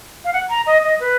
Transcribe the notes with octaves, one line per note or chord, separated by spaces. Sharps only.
F5
F#5
A#5
D#5
D#5
B4